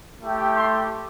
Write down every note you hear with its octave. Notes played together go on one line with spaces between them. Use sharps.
A3 E4 G4
C6